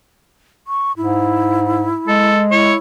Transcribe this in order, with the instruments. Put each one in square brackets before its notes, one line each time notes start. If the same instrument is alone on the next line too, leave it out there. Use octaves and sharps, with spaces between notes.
[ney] C#6
[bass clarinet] G#2 [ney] E4
[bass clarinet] G#3 [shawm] A4
[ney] E4 [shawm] C#5